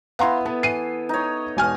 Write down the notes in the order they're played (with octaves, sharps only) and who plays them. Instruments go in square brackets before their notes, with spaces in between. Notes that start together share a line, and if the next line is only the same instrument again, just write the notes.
[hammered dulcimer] B3 E4 [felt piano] F5 A#5 C6
[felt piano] B3 [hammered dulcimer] A4
[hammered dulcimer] E3 [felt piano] C7 D#7
[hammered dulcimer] D#4 C#5
[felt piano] E1 G#5 F6